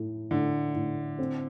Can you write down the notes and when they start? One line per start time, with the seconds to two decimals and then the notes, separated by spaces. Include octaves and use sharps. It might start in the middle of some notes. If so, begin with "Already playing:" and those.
Already playing: A2
0.31 A2 D3
0.75 A2
1.19 C4